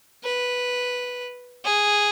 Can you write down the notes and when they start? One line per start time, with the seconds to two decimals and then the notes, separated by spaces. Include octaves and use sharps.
0.23 B4
1.64 G#4